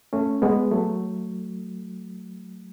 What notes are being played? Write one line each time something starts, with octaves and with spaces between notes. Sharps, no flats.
A3 C#4
G#3 B3
F#3 A3